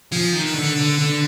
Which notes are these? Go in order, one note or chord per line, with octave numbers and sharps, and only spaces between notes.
F3 G#4
D#3
B4
D3
D3
D3